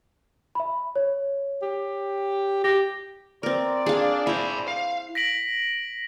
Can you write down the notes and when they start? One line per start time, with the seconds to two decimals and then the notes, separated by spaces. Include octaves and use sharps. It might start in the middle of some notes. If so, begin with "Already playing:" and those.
0.55 E5 B5
0.96 C#5
1.62 G4
2.64 G4 A#6
3.43 C4 A#4 D5
3.86 D4 G#4 F5
4.27 E4 C5 A5 B5
4.68 F5
5.15 A#6 B6 D7 F#7